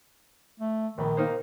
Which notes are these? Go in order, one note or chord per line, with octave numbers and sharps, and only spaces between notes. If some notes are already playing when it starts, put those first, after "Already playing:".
A3
A#1 D#3 B5
A#3 D#4 C5